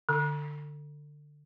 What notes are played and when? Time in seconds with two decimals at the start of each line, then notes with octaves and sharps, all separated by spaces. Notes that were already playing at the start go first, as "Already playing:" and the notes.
0.09 D3